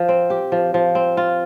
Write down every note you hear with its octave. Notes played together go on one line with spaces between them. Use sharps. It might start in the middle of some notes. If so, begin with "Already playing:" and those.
Already playing: F3
C4
G4
F3
F3
C4
F4